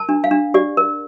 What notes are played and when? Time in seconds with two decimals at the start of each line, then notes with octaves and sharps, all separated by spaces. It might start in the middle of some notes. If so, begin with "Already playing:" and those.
Already playing: A#4 A5
0.09 D4
0.24 F5
0.31 D4
0.54 G4 D5
0.77 A#4